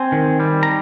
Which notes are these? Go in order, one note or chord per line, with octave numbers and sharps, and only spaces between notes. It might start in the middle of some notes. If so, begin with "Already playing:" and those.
Already playing: C4 G#5
D#3
G3
A#5